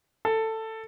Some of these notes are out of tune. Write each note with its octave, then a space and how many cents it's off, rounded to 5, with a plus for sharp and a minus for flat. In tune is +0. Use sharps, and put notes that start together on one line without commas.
A4 +15